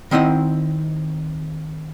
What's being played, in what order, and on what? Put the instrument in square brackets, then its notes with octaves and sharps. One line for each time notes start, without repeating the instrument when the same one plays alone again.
[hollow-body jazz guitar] D#3 C4 E4 D#5 F#5